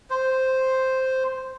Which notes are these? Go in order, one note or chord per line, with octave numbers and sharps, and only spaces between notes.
C5